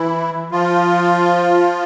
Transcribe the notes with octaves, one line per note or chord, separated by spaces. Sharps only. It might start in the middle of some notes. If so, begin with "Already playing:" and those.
Already playing: E3 E4
F3 F4